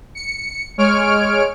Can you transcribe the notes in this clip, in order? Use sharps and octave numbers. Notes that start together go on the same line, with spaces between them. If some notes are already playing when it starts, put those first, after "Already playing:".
C#7
G#3 C#5 F6 D7